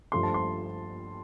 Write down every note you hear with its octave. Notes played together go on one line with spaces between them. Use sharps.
G2 F3 A3 C6
A5
C6